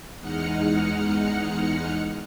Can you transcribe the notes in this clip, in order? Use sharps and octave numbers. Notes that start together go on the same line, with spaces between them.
E2 G#3 D#4 F#5 F6 C#7